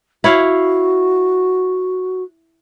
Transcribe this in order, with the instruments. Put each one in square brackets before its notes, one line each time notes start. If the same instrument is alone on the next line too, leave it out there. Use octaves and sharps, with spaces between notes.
[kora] E4 C#5 F5 [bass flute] F#4